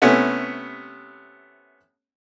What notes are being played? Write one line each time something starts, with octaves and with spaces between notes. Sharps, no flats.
C3 A3 B3 C#4 E4